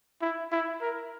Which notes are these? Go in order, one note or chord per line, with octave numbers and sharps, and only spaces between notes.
E4
E4
A#4